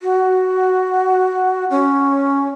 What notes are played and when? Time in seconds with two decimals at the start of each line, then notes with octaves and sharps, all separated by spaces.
0.01 F#4
1.70 C#4